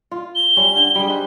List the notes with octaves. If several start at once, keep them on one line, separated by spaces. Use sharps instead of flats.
F4
G7
G3 C#4
D3
G3 G#4
D#4 B4 C5